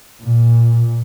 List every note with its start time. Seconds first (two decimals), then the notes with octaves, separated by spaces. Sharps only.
0.22 A#2